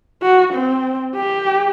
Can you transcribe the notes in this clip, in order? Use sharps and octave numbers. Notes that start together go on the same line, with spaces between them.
F#4
C4
G4